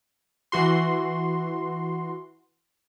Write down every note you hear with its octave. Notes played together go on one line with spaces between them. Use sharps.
E3 F#4 C6